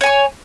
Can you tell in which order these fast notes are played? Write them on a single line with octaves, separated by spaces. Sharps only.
C#5 G#5 C#6